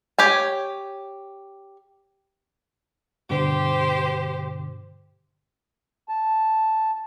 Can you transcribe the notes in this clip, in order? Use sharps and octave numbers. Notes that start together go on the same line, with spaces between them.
G4 C#5 G#5
G2 B2 D3 G4 C5
A5